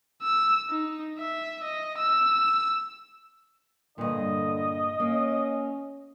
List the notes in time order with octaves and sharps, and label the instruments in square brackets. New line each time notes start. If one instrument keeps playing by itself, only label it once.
[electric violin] E6
D#4
E5
D#5
E6
[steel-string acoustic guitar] G2 A#2 [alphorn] D3 [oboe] D#5
[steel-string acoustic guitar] A#3 [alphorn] C#4